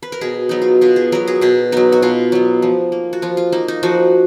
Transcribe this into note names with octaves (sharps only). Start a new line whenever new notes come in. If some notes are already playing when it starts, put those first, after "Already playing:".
B4
A#4
B2 G#4
F#3 B3 D#4
F4
B2 F4
G#4
F#3 B3 A#4
G#4
B2 G#4
F#3 B3 D#4
F#4
B2 F4
F#3 B3
F3
A#3
F#4
F3 F4
F4
A#3 D#4
D#4
F3 F#4